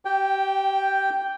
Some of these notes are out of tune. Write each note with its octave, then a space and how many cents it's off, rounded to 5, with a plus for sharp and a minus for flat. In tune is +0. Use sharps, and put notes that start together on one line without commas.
G4 -25 G5 +0